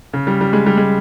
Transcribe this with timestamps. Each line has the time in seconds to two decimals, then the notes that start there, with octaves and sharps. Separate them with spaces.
0.13 C#3
0.27 G3
0.41 G3
0.53 G#3
0.66 G3
0.77 G#3